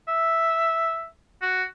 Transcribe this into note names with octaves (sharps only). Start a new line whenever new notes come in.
E5
F#4